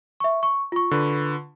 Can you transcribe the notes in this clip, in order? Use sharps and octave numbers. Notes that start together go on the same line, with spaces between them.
E5 C#6
C#6
F4 C#6
D3 B4